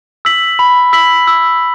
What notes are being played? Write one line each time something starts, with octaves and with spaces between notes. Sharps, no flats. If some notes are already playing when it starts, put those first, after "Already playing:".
E6 B6 F#7
B5
E6 B6 F#7
E6